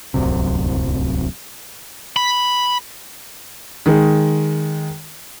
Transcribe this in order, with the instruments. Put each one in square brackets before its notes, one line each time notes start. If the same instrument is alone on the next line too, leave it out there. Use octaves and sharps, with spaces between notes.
[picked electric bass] D1 C2 F#2 C3
[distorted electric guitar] B5
[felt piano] D#3 G#3